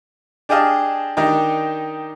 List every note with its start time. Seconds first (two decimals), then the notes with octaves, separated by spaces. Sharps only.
0.49 D4 G4 G#4 D#5 F5 A5
1.17 D#3 D4 D#4 G4